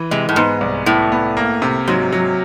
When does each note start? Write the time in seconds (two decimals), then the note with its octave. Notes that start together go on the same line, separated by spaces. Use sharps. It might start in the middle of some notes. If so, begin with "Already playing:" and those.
Already playing: E3
0.11 C3 G#3
0.29 A2
0.36 G#2 B3
0.61 C2
0.86 A2 B3
1.12 B3
1.37 A#3
1.62 C3
1.88 G#2 F#3
2.12 F#3